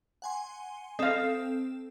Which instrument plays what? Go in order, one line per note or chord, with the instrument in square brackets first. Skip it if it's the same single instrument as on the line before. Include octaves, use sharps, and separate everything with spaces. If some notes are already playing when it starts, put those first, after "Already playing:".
[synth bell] F#5 G#5 C6
[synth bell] C4 A4 E7 [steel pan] D#5 F5